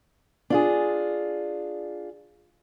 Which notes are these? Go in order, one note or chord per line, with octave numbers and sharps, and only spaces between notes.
D4 F4 G#4